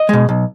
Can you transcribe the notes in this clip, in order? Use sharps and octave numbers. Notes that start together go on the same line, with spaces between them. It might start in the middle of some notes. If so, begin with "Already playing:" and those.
Already playing: D#5
B2 G#3
B1